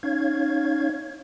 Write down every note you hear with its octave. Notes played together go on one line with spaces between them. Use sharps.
C#4 D#4 C#5 F5 G#6